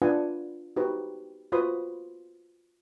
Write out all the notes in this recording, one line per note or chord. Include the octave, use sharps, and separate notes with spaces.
D4 F4 B4 F5 F#5 G#5
D#4 F#4 G4 B4 C5
F4 F#4 B4 C5 B5 D#6